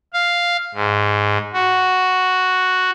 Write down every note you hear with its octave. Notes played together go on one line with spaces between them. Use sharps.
F5
G#2
F#4